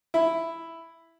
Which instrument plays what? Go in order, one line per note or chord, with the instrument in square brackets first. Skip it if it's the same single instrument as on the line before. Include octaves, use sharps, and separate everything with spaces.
[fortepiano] E4